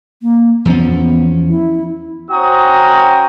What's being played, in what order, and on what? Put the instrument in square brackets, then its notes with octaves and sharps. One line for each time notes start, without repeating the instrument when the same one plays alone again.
[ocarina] A#3
[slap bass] E2 F3 C#4 [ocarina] B3
[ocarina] E4
[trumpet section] C#4 F#4 C5 G5 A#5 D#6